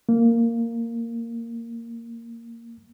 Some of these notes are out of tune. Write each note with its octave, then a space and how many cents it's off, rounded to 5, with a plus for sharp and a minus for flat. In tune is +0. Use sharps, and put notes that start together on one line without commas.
A#3 -10